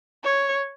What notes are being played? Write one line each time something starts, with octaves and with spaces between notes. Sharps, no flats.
C#5